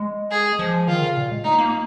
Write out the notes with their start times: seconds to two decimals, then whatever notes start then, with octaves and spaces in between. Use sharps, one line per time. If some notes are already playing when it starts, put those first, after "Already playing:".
Already playing: G#3
0.31 G#4
0.59 F3
0.88 D#3 F4
1.02 C#3
1.17 A#2
1.31 G#3
1.44 A#3 D#4
1.58 A#3